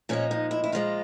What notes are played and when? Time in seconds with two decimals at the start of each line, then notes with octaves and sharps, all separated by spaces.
0.09 A#2 F3 G#3 C#4
0.31 D#4
0.51 E4
0.64 E4
0.72 A#2 F3 G#3 F4